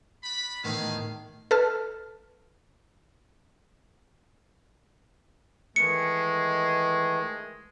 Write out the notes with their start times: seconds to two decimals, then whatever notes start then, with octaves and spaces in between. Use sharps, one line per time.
0.24 D4 B5
0.64 E2 A2 D#3 G4 G#4 F5
1.51 A4 B4 A5 F6
5.76 D#3 E3 G#3 A3 C#7